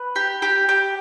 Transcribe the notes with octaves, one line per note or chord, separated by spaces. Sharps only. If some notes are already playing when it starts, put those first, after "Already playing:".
Already playing: B4
G4
G4
G4